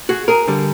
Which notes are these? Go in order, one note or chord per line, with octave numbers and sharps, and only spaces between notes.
F#4 G#4
G#4 A#4
D3 G3